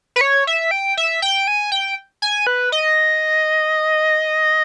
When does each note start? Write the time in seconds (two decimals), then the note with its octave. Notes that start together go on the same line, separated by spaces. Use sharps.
0.16 B4
0.21 C#5
0.47 E5
0.71 G5
0.97 E5
1.22 G5
1.48 G#5
1.72 G5
2.22 G#5
2.47 B4
2.72 D#5